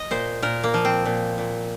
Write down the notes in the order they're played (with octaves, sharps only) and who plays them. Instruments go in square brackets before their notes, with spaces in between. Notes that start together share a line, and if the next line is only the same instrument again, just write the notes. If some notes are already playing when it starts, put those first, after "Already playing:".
Already playing: [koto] D#5
A#2 C5
A#2 A#4
A#3
F3
C4
A#2
A#2